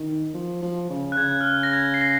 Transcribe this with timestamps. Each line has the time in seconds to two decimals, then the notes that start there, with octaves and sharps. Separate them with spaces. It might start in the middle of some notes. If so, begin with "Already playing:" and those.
Already playing: D#3
0.34 F3
0.62 F3
0.90 C#3
1.12 F#6
1.17 C#3 G#6
1.41 F6
1.45 F#6
1.63 A#6
1.73 G#6
1.94 C7
2.01 A#6